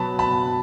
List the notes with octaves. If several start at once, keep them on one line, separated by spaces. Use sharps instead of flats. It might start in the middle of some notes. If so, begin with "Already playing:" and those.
Already playing: B2 F#3 A5 B5
A5 B5